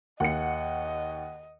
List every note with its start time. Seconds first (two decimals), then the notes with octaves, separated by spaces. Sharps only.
0.20 D#2 D#5 F#5 C#7